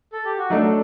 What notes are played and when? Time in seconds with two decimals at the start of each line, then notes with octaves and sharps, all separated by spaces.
0.12 A4
0.25 G4
0.38 F#4
0.50 F#3 A3 D4 D#4 A4 D5